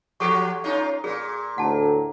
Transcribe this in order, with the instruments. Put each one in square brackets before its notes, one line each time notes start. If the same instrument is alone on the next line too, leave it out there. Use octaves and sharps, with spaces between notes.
[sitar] F3 F#4 G4 [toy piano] A4 C#6
[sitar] C#4 D#4 F4
[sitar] A#2 [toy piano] G#4
[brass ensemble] D2 A2 [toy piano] F#5 A5